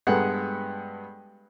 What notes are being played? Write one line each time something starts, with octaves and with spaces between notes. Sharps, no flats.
G2 G#3 B3 A4 F#5